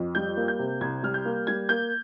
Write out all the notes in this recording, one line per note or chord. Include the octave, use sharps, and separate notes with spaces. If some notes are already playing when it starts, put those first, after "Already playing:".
Already playing: F2
G3 G6
A#3
G6
C3
C2 G#6
G3 F6
G6
A#3
G3 G#6
A#3 G6